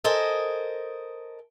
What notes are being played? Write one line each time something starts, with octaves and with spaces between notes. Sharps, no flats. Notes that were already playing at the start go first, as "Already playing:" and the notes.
A4 A#4 C5 D#5 G#5